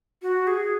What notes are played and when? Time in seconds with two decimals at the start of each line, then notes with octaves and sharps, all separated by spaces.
0.22 F#4
0.47 G#4